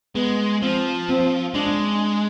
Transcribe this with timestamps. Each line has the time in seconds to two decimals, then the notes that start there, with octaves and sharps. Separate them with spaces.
0.15 G#3 B3
0.62 F3 C4
1.09 C4
1.54 G#3 D4